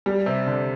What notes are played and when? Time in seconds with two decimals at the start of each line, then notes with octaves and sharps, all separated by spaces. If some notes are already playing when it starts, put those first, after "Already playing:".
0.06 G3
0.26 C3
0.47 D3